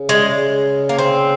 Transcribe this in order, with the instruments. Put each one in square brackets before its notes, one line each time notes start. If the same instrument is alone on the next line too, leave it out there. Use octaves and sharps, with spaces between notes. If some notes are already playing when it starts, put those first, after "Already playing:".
Already playing: [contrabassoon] C#3
[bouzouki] G#3
A#3
C4